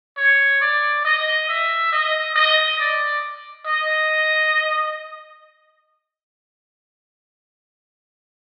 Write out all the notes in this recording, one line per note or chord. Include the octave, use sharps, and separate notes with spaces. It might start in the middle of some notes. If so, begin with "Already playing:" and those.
C#5
D5
D#5
E5
D#5
D#5
D5
D#5